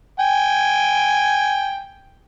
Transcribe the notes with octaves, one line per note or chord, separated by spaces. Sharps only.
G5 G#5